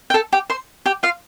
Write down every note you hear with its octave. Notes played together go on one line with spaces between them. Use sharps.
G5
A4 A5
G4 G5
C5 C6
G4 G5
F4 F5